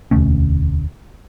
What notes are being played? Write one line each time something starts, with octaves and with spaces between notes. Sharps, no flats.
E1 D2 A3 C#4